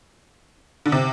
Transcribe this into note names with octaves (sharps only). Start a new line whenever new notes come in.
D3
C3